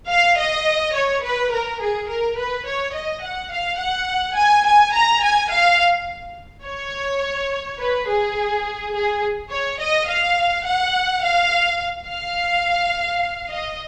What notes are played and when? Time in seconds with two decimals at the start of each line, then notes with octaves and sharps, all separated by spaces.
0.10 F5
0.39 D#5
0.96 C#5
1.24 B4
1.53 A#4
1.81 G#4
2.10 A#4
2.38 B4
2.67 C#5
2.95 D#5
3.24 F#5
3.53 F5
3.80 F#5
4.38 G#5
4.66 G#5
4.95 A#5
5.24 G#5
5.52 F5
6.66 C#5
7.80 B4
8.08 G#4
8.94 G#4
9.51 C#5
9.80 D#5
10.08 F5
10.65 F#5
11.23 F5
12.07 F5
13.50 D#5